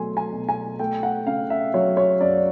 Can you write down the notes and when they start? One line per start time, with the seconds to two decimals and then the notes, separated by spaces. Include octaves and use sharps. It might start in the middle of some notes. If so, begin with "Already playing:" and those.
Already playing: B2 F#3 A3 G#5 C6
0.17 G#5
0.33 B2
0.49 G#5
0.79 A3 G5
1.03 F#5
1.27 C#3 F5
1.50 E5
1.74 F#3 C#5
1.97 C#5
2.21 F#2 D5